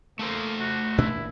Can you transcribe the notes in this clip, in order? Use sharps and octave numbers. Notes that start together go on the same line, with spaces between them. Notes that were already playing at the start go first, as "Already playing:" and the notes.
A3 A#3 A4 C5
F#4
A1 A#2 D4 E4